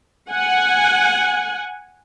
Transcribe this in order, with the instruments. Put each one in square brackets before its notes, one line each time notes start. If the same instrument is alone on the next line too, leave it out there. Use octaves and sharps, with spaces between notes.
[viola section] F#5 G#5